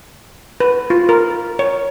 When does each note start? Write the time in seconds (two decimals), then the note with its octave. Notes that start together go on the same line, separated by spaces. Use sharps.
0.60 B4
0.90 F4
1.09 A#4
1.59 C#5